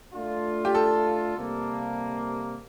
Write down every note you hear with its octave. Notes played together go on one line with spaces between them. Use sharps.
A3 D4 F4
G4
A4
C3 G3 A#3